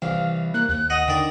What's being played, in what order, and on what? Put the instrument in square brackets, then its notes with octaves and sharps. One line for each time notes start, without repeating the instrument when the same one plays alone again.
[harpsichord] C2 [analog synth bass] E3 [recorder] F5
[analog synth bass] A#3 [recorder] F#6
[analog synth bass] D#2 [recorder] F#6
[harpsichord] D#5 F#5 [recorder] D#6
[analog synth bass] D3 [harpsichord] D#3 D5